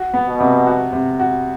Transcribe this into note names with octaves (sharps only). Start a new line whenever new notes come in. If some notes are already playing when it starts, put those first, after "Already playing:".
Already playing: F#4
B3
B2
C3
F#4
C3
F#4